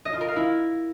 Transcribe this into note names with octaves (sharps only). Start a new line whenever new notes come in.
D#5
F4
A#4
F5
E4